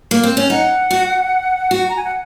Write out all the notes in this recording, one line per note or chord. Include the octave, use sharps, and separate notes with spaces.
A#3
C4
C#4
D#4 F#5
F#4
F#4
A#5
G#5
F#5